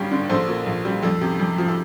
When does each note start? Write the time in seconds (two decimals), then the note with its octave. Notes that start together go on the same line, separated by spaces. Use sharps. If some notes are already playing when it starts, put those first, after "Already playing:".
Already playing: G1 G2 G3 G4
0.11 D3
0.29 A#1 A4 C5
0.48 A#2
0.66 A#1
0.85 G3
1.03 F2 A4
1.21 C3
1.40 F2
1.58 F3
1.68 A4